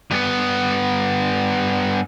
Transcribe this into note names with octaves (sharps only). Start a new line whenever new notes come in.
G2 B3